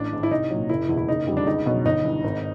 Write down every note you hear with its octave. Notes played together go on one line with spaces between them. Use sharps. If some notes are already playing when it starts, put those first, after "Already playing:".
Already playing: A1 D4
G#2 D#3
E4
C2 D#4
A#2 F#3
F#1 E4
E2 B2
E4
F#1 D#4
F2 D3 G3
D4
C#2 D#4
B2 F#3
G1 D#4
G2 E3
G#1